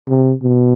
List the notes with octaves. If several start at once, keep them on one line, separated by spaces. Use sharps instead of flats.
C3
B2